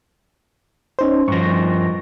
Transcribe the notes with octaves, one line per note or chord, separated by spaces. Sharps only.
C#4 D#4 C5
G2 F3 C#6 A#6